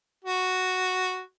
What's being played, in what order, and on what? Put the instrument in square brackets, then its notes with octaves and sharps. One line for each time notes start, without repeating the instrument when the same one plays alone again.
[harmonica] F#4